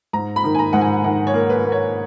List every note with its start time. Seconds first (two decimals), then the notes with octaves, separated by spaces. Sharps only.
0.13 G#2 A#5
0.36 B5
0.44 D#3
0.55 G#5
0.59 A#5
0.73 G#2 F#5
0.81 G#5
1.04 D#3 F#5
1.27 C#5
1.34 A#3
1.50 B4
1.65 A#3
1.72 C#5